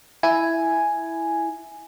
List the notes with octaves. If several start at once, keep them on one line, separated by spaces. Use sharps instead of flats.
E4 G#5